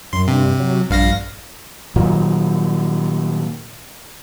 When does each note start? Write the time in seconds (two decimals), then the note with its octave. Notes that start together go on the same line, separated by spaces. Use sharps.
0.13 F#2 C6
0.28 G2 C3
0.59 F#3
0.90 A#1 G2 F5 A#6
1.96 A#2 D#3 F#3